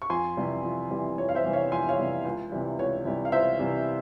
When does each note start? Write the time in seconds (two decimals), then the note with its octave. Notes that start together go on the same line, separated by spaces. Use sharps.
0.02 C#6
0.10 F2 G#5 C6
0.37 C3 E3 G3
0.63 F2
0.91 C3 E3 G3
1.18 F2 C#5
1.29 F5
1.35 C5 E5
1.44 C3 E3 G3
1.53 C#5 F5
1.71 F2 G#5 C6
1.89 C#5 F5
1.98 C3 E3 G3
2.25 C#2
2.52 C3 E3 G3
2.79 C#2 C#5
3.05 C3 E3 G3
3.25 F5
3.32 C#2 C5 E5
3.59 C3 E3 G3